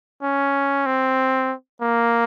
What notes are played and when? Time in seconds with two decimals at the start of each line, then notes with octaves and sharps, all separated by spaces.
0.23 C#4
0.86 C4
1.82 A#3